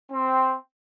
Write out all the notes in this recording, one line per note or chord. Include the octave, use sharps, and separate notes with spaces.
C4